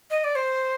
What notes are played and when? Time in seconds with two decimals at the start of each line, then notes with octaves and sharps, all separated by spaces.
0.10 D#5
0.24 D5
0.35 C5